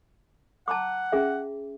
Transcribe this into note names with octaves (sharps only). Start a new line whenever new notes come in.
F#5 A5 A#5 D6
C#4 G#4 E5